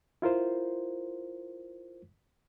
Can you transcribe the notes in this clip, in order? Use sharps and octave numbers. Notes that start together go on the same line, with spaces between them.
E4 F4 A#4 C5